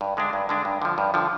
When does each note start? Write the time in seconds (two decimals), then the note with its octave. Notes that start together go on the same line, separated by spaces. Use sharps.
0.01 G2
0.17 D3 G#3 D4
0.33 G2
0.49 D3 G#3 D4
0.65 G2
0.82 D3 F3
0.98 G2
1.14 D3 F3